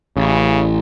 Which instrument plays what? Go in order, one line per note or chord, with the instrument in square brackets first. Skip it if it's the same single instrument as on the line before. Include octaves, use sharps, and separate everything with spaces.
[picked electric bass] A1 [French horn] C#3